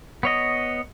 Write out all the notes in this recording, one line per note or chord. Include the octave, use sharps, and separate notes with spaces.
B3 C#5 D#5